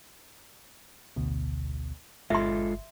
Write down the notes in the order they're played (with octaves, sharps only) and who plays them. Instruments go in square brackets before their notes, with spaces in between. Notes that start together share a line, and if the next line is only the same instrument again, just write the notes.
[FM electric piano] A1 D2 B2
[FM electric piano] G1 [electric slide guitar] G#3 F4 A4 [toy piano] E5 C6